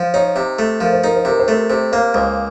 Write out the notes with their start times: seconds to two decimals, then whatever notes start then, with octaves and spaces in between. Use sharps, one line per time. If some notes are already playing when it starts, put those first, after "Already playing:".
Already playing: F3
0.14 D#4 C#5
0.36 C3
0.59 A3
0.81 F3 A#4
0.93 C5
1.04 D#4 A#4
1.16 C5
1.25 C3 A#4
1.40 C5
1.48 A3 A#4
1.70 C3 C5
1.92 A#3 C5
2.14 C#2 C5